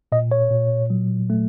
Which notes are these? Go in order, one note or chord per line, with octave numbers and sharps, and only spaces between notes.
A#2 D#5
C#5
A#2
F#3
A3